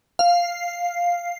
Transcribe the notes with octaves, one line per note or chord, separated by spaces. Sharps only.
F5